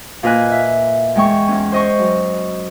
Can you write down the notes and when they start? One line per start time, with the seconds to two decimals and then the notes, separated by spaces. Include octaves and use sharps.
0.23 A#2 F4 B4 D#5 G#5 F#6
0.51 E5
1.15 E2 G#3 G5 C#6
1.48 E2 C#4
1.72 C5 D#5 C#6
1.99 F#2